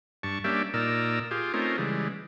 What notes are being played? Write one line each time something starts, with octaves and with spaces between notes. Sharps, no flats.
G2 A5 C#6
G3 A#3 C#4 D4 G4 E5
A#2 D#4 A#4 D5 E6
F4 G4 G#4
A3 C4 C#4 D#4 F4 A#4
C#3 E3 G3 G#3